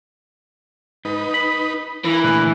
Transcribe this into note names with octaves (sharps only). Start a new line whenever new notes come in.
G#2 D#4 B4
B5
E3 A#4
A#2 D3 A3 G#4 B4